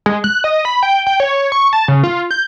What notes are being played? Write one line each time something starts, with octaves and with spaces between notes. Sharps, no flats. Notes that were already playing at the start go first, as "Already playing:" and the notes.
G#3
F#6
D#5
B5
G5
G5
C#5
C#6
A5
C#3
F4
G6